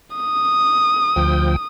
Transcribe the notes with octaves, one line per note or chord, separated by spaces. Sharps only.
D#6
D2 F3 G5